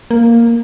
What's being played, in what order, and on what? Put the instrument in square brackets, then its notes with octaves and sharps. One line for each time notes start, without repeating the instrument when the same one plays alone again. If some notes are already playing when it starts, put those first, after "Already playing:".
[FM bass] A#3